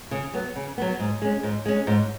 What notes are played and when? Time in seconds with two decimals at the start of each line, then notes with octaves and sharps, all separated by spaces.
0.11 C#3
0.33 F#3 B3
0.56 C#3
0.78 F#3 B3
0.99 G#2
1.22 G#3 C#4
1.43 G#2
1.65 G#3 C#4
1.87 G#2